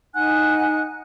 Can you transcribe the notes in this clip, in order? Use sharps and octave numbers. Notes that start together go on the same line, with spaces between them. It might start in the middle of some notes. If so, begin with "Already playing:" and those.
D#4 F#5 G#5 F#6